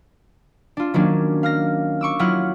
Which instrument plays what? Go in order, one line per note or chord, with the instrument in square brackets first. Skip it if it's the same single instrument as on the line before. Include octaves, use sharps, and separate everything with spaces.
[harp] D4 F4
D#3 F#3 A#3 C#4 D4
F5 F6 A#6
C#6 D6 E6
F#3 E4 F4 F#5 F6